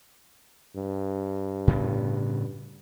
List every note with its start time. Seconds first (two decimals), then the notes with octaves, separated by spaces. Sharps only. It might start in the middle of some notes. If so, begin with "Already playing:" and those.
0.75 G2
1.67 A2 C#3 B3